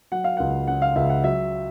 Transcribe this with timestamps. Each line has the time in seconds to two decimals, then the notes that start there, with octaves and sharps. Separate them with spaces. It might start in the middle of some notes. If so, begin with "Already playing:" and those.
0.12 F#3 F#5
0.24 F5
0.37 C#2 F#5
0.67 C#3 F#5
0.82 F5
0.95 C#2 E5
1.10 F#5
1.24 F#3 E5